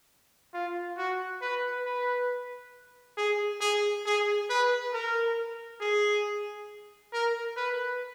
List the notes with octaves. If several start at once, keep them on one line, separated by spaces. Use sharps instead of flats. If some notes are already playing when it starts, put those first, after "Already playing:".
F4
F#4
B4
B4
G#4
G#4
G#4
B4
A#4
G#4
A#4
B4